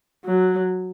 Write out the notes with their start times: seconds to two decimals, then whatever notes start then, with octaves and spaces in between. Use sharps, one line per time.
0.25 F#3